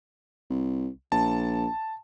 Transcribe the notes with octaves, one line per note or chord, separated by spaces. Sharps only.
C2
A#1 A5